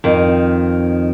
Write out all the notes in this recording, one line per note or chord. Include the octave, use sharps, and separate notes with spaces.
F2 D#3